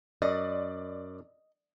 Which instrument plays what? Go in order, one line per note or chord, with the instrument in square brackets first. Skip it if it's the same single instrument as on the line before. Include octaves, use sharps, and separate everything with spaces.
[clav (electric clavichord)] F#2 [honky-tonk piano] D5 [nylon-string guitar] D#5